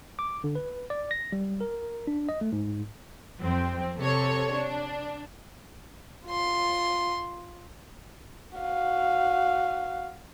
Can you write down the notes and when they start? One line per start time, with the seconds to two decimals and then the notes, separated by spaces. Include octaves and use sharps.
0.19 D6
0.44 D3
0.55 B4
0.90 D5
1.11 A#6
1.32 G3
1.61 A#4
2.07 D4
2.29 D#5
2.41 A3
2.52 G#2
3.40 F2 C4
3.98 C3 A4 C#5
4.55 D4
6.26 F4 C6
8.58 F#4 F5